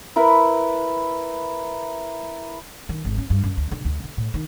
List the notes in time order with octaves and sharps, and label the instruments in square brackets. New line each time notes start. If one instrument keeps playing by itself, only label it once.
[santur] E4 A#4 B4
[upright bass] D#3
G#1
C#4
G2
F#2
D2
D3
D2
D3
A2
D#3